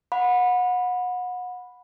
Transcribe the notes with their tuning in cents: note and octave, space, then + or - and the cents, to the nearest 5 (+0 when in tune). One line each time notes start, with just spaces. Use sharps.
F#5 -30 B5 +0